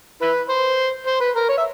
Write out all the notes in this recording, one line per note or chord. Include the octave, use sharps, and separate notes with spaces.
E4 B4
C5
C5
B4
A#4
C#5
E5